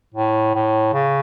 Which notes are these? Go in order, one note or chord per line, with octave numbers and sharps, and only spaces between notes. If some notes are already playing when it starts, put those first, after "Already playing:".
A2
A2
C#3